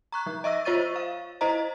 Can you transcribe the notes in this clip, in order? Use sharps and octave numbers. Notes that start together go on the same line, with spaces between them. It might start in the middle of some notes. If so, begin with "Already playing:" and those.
A#5 C#6 F#6
F3
D#5 E5 C#6 E6 A#6
F4 C5 C#5 C#6 A6 D#7
F5
E4 C5 D#5 A#5